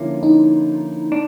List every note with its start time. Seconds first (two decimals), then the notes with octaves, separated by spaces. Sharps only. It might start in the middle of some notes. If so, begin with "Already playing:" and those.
Already playing: D3 F3 A#3 C#4 E4 F4
0.23 D#4
1.12 D4